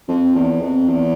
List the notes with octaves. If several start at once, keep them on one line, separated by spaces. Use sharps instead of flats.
F2
E2
F2
E2